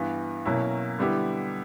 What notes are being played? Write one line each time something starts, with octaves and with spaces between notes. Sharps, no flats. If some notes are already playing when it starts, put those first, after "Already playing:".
Already playing: G2 E3 B3
B2 F#3 A#3 C#4 E4
D3 G3 B3 E4 G4